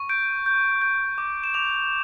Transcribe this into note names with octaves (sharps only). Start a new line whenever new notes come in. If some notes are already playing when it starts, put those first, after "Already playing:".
Already playing: C#6
G6 D7
G6
G6
D6
E7
D6 F7